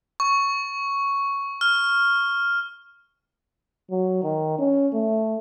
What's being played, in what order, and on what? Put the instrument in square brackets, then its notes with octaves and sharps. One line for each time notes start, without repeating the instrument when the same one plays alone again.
[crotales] C#6
F6
[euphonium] F#3
D#3
C#4
A3